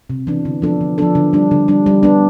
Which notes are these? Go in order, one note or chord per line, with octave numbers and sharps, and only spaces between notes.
C3
E3 B3 D4
D3
F3 B3 D4 A4
D3
F3 B3 D4 A4
D3
G3 D4
D3
G3 D4
G3
B3 D4